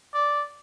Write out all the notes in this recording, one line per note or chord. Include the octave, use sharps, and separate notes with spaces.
D5